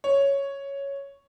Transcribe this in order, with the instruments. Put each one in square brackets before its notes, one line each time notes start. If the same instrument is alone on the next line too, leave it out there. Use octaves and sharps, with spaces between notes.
[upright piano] C#5